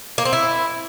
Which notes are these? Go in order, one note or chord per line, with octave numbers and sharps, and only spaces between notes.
A#3
C4
E4